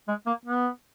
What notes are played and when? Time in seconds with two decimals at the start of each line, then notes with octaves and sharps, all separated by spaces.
0.08 G#3
0.27 A#3
0.45 B3